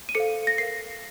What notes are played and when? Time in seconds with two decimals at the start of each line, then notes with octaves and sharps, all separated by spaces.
0.09 D#7
0.15 A4 C5 F5 C#7
0.47 A#6
0.58 A#4 F5 C7